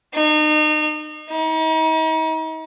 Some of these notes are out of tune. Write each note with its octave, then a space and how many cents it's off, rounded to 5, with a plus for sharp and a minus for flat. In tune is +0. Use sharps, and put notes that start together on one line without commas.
D#4 -35
D#4 +40